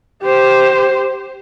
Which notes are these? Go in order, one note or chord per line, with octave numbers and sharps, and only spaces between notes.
G4 C5